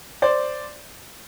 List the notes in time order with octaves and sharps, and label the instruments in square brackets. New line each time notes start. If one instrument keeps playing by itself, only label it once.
[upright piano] C5 D5